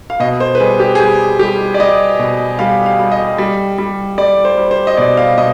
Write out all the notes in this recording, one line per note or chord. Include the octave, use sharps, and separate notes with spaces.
F5
B2 D#5
C5
B4
G3 G#4
G4
G#4
G3 G4
G3 G4
D5
G3 D#5
B2
G3 F5
F5
G3
D#5
G3
G3
G3 D5
C5
G3
C5
D#5
B2 D5
F5
B2 D#5